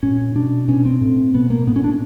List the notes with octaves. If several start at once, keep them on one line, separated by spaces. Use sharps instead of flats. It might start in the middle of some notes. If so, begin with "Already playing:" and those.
A#2 C#4
B2 D4
B2 C#4
C4
A2
B2 B3
A#3
A2 B3
C#4
D4